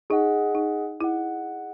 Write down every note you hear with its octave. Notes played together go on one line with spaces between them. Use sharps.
D#4 G#4 D#5 F#5
D#4
E4 G#4 D#5 F#5